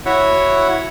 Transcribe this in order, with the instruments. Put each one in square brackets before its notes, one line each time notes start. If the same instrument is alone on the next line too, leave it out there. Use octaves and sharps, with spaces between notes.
[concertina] E4 F#4 C#5 E5 F#5